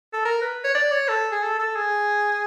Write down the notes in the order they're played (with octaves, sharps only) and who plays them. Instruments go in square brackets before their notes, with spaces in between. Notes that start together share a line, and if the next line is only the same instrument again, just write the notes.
[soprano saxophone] A4
A#4
B4
C#5
D5
C#5
A4
G#4
A4
A4
G#4